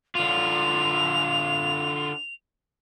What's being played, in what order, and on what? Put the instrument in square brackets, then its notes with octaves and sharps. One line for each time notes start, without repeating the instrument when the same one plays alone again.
[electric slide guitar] D3 F4 [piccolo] F7